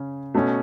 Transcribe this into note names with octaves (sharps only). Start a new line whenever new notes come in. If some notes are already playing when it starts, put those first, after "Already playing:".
Already playing: C#3 C#4
B2 A3 C#4